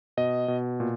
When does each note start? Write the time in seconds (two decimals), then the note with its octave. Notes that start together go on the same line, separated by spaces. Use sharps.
0.17 B2 D#5
0.48 B2
0.80 A#2